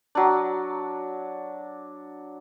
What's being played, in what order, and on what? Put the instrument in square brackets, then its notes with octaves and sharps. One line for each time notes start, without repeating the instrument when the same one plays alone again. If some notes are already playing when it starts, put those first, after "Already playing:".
[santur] F#3 D4